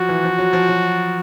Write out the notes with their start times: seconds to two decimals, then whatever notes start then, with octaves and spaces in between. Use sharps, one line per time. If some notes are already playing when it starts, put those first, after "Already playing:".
Already playing: F3 F#3 F#4
0.09 E3
0.24 F3
0.38 F#3
0.53 F3
0.69 F#3